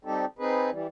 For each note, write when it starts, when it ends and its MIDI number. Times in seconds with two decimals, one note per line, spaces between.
0.05 0.25 55
0.05 0.25 60
0.05 0.25 63
0.05 0.25 67
0.05 0.25 69
0.39 0.70 60
0.39 0.70 63
0.39 0.70 68
0.39 0.70 71
0.70 0.87 52
0.70 0.87 55